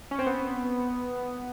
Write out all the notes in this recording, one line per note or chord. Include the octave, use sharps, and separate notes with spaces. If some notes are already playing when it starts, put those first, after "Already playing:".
C#4
C4
B3